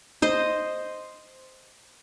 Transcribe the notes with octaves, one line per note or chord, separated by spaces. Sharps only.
C5 D#5